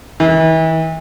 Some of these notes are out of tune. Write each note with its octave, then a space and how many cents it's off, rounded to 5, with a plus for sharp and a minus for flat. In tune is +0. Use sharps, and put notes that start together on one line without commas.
E3 -40